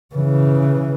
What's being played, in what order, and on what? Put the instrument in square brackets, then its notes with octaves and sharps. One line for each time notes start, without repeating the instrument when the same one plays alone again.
[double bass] C#3 E3